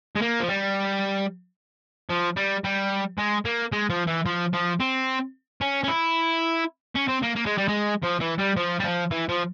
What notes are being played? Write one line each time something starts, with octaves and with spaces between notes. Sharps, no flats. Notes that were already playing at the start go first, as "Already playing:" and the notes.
G#3
A#3
F3
G3
F3
G3
G3
G#3
A#3
G#3
F3
E3
F3
F3
C4
C#4
C#4
E4
C#4
C4
A#3
A#3
G#3
G3
G#3
F3
E3
G3
F3
G3
F3
E3
F3